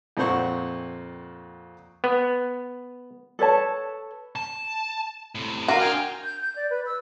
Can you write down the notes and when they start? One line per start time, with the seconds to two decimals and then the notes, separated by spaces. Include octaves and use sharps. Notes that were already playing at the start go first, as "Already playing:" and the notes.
0.17 F2 A#2 C4 C5 F#5 C#6
2.04 B3
3.39 A4 B4 C#5 A5
4.36 A5
5.35 A2 C3
5.68 D4 F4 F#4 A#4 F5 A#5 D6
5.81 D#4 F4 G5 G#5 F6
6.24 G6
6.41 G6
6.56 D5
6.70 B4
6.86 E6